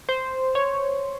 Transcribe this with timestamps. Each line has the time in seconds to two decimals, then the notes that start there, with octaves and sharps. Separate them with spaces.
0.09 C5
0.55 C#5